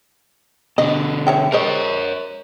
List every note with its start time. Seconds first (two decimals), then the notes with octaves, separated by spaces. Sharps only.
0.78 B2 D3 D#5
1.27 C#5 E5 G5
1.52 G#3 A#4 C5 C#5 D#5